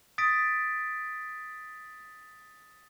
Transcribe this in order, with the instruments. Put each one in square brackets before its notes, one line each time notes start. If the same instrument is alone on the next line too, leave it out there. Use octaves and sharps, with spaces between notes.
[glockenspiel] D#6 A6 B6 D7